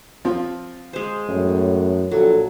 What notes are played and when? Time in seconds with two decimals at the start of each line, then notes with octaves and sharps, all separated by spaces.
0.25 F3 C4 F4
0.93 G#3 C5
1.29 F#2 A2
2.11 A#1 F#3 A4